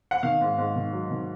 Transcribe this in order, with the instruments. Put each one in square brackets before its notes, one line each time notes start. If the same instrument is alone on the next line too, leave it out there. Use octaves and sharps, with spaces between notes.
[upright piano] F#5
D#3 F5
G#2
G#2
D#3
F#3
D#3